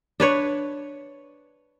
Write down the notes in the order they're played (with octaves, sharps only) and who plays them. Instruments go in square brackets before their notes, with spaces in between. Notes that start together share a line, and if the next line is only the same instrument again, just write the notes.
[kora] D4 B4 C#5